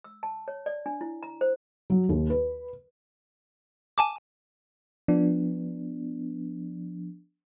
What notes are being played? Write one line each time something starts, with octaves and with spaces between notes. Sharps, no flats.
E6
A5
C#5
D5
D4
E4
A#5
C5
F#3
D#2
B4
G#5 A5 D6
F3 B3 D4